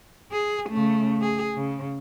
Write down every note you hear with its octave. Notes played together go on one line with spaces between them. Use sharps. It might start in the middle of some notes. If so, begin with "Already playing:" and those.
G#4
C#3 A3
G#4
C#3